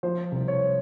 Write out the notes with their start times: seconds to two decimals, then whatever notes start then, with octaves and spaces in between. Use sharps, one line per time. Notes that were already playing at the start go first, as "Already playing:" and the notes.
0.03 F3 C5
0.32 C2
0.48 C#5